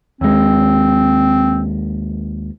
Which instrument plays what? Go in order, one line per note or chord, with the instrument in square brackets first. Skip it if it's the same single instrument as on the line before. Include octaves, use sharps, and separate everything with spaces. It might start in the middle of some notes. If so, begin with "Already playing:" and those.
[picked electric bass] D#2 G#3 [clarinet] C4